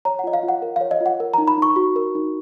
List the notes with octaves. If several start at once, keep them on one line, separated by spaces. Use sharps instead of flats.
C#5 A#5
F#5
F4 D#5
F5
F4
F#5
A#4
F5
C#5
D#5
F4 F#5
A#4
A#5
D#4
B5
D#4 C#6
F#4
A#4
D#4